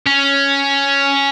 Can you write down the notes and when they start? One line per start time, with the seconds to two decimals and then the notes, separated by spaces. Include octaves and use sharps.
0.06 C#4